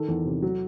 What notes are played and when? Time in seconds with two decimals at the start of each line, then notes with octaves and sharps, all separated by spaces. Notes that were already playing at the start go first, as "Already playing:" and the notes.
Already playing: D#3 A4
0.08 E2
0.25 C3
0.42 F#3